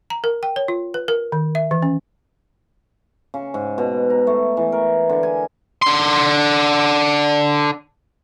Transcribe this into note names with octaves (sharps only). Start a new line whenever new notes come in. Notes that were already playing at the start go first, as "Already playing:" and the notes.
A#5
A#4
G5
C#5
F4
B4
A#4
D#3
E5
E3
C#4
C#3
G#2
B2
A#5
A3
E3
A#4
D3
G#5
D3 C6